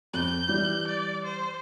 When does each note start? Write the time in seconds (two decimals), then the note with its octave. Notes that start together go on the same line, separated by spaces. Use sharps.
0.14 F2 G6
0.48 E3 G3
0.87 D5
1.25 C5